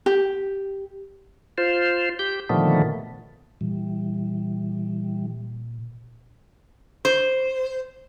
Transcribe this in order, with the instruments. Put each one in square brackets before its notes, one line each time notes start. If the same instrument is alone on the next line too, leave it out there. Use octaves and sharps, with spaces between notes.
[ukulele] G4
[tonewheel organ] F4 C5
G4 G6
A#2 D3 D#3 F3 A3 B3
[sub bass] A#2 [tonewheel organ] E3 G3
[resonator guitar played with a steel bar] C5